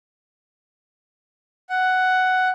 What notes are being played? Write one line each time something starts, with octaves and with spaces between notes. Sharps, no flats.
F#5